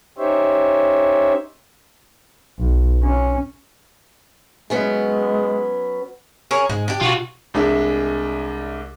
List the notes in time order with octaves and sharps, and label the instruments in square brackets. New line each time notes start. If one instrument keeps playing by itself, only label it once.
[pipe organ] C#4 D#4 G4 C5 C#5 E5
[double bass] B1
C#4
[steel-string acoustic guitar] F#3 B3 C#4 [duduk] G#3
[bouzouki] G#4 A#4 C#5
[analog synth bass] G#2 [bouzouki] G#3
[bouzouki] D4 G4
[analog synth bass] B2 [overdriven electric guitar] F4 F#4
[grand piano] C2 G#3 D4 E5